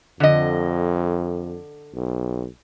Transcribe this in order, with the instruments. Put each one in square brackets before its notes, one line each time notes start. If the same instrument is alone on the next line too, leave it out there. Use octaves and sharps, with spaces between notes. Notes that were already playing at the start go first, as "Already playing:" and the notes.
[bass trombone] F2 [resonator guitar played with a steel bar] D3 D#5
[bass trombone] B1